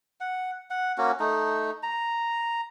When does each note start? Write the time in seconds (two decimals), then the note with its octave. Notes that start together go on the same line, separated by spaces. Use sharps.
0.21 F#5
0.70 F#5
0.98 A#3 C#4 F#4
1.20 A3 D#4
1.83 A#5